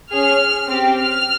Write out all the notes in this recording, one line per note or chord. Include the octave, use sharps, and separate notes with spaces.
C#4 G#4 F6
C4 G4
F6